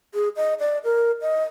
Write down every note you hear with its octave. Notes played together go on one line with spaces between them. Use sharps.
G#4
D#5
D5
A#4
D#5